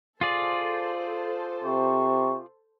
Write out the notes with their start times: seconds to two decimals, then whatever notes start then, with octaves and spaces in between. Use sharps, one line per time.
0.21 F4 G#4 A4 C5 D5
1.64 C3 C#6